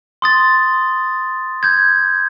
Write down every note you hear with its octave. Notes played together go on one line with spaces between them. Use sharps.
C6 D#6 A6
G6 G#6